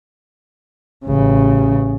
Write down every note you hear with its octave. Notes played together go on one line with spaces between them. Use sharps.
A1 C#3